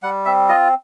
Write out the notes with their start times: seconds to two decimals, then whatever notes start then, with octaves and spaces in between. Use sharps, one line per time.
0.03 G3 F#5
0.25 C4 E5
0.49 F4 D#5